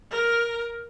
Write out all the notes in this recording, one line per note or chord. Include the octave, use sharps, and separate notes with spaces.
A#4